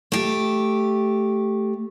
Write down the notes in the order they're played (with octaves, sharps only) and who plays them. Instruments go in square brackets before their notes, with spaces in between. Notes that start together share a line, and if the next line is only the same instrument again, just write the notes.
[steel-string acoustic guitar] A3 G4